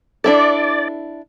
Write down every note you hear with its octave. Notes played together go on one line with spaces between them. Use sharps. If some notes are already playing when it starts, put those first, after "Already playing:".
D4 E4 A4 D5